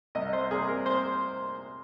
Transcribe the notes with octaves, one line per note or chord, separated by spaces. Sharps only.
C2 D#5
C5
C3 G3 A#3 G#4
A#4
C5